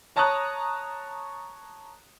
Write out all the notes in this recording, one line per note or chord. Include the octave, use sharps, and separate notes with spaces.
C#5 A5 A#5 C#6 D#6 F#6